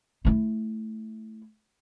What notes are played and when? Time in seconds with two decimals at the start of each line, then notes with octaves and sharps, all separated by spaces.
0.25 A3 E4